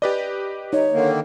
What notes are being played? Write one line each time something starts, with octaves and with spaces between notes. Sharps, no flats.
G4 B4 D5 D#5
D#4 C#5
D3 D#3 A#3